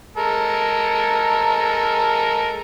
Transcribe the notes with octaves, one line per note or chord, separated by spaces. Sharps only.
G#3 A4 A#4